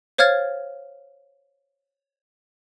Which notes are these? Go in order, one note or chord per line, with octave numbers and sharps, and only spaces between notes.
C5 C#5 F5 F6 G#6 A6